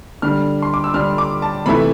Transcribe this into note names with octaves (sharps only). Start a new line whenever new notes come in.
D3 G3 D4 F6
C6
D6
E6
D3 G3 D4 F6
D6
A5
C3 E3 A3 E4 B5